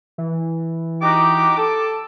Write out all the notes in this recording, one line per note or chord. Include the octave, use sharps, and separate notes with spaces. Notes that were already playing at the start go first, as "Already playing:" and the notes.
E3
D#4 F#4 G4 D6
A4 D6